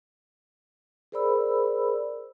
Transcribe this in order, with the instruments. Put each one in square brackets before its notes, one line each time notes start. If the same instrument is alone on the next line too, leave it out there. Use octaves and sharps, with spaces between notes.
[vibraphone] G#4 A#4 C5 D5 B5 E6